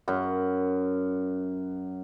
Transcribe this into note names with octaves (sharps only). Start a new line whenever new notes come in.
F#2 F#5